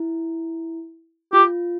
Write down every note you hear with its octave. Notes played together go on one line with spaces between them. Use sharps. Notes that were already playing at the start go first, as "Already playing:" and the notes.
Already playing: E4
F4 G4